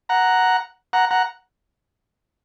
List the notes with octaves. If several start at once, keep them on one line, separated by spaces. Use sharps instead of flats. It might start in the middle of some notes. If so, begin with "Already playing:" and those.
F#5 A#5
F#5 A#5
F#5 A#5